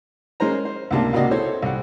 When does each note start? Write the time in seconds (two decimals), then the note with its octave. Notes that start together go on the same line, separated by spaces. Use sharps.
0.40 G#3 C#4 A#4 C5 A#5
0.65 C5
0.91 C#2 A2 C3 A#3 D4 A5
1.13 C#2 C3 A#3 F#4 D5 D#5
1.31 E4 A4 C5 C#5
1.63 C2 F#5